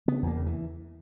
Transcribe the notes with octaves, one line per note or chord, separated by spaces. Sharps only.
C#3 B3
E2 A#3
C#3
E3